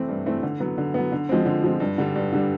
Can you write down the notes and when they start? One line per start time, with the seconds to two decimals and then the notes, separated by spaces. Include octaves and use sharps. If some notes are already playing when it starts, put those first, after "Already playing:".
Already playing: E3 A3 C4
0.09 G2
0.26 E3 A3 C4
0.43 D3
0.60 F#3 B3
0.78 D3
0.94 F#3 B3
1.12 D3
1.29 F3 G#3 C4
1.46 D3
1.64 F3 G#3 C4
1.80 G2
1.98 D3 G3
2.15 G2
2.33 D3 G3